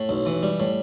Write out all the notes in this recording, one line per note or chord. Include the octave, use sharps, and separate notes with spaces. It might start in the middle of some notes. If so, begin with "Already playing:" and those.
Already playing: A2
B1
E3
G3
A2